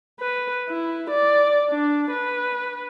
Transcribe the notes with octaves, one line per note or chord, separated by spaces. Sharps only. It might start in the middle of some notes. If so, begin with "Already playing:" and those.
B4
E4
D5
D4
B4